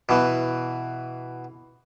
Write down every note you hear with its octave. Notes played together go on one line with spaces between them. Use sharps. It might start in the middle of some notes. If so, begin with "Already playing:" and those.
B2 E3